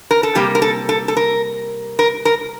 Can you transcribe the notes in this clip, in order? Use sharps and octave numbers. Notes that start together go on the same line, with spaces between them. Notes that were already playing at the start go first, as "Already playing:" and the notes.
A#4
A4
C3 G3 A#3 G4
A#4
A4
A4
A4
A#4
A#4
A#4